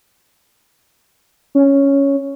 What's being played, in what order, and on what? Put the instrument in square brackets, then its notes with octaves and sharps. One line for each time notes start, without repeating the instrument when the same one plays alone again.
[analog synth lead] C#4